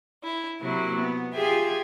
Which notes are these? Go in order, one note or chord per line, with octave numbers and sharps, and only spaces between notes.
E4
C3 F#3 A#3 E4
B3
F4 G4 G#4 E5 G5 G#5